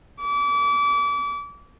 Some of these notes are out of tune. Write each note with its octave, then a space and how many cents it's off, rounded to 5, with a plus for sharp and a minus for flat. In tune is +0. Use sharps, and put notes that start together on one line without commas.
D6 -35